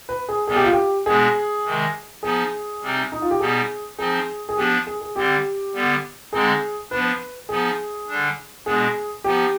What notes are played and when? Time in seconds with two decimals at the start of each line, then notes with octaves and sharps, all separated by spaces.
0.09 B4
0.29 G#4
0.48 C3 G3 B3 G#4
0.56 G4
0.64 F4
0.73 G4
1.06 B2 G#3 B3 D4 G#4
1.65 C3 D#3 G#3
2.23 F3 B3 D#4 G#4
2.82 C3 G3 C4 D#4
3.12 D#4
3.22 F4
3.31 G4
3.40 B2 G3 B3 D#4 G#4
3.98 F3 C4 D#4 G#4
4.49 G#4
4.57 F3 B3 D4 G4
4.86 G#4
5.01 G#4
5.16 D3 G3 C4 G4
5.74 D3 G3 B3
6.33 D3 G#3 C4 D#4 G#4
6.90 F3 B3 D4 B4
7.49 F3 B3 D#4 G#4
8.08 D3 G3 D4
8.66 B2 G#3 B3 D4 G#4
9.24 F3 B3 D#4 G4